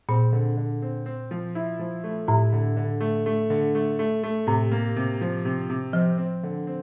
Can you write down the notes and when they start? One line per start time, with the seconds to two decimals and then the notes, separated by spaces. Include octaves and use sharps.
0.09 A#2 C4
0.32 D3
0.57 D3
0.82 C4
1.06 C4
1.31 F3
1.55 E4
1.79 F3
2.04 A3
2.28 A2 E4
2.53 D3
2.76 D3
3.01 A3
3.26 A3
3.50 D3
3.75 A3
3.99 A3
4.23 A3
4.47 A2 C3
4.71 A#3
4.96 C3
5.21 F3
5.45 C3
5.70 C3
5.93 F3 C4
6.18 C4
6.43 D3
6.67 C4